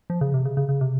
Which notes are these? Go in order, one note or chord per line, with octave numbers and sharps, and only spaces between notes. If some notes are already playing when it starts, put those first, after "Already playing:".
F3
C#3
C3
C#3
C#3
C#3
C3